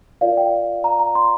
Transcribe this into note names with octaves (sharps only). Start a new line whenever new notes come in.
F4 A#4 D5 F5
G5
A#5
A#5
C6